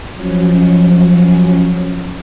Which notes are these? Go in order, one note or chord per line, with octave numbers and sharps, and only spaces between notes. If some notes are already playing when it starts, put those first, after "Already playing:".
F3 F#3 C#4